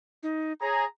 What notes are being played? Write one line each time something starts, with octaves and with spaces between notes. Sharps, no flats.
D#4
G#4 C#5 A#5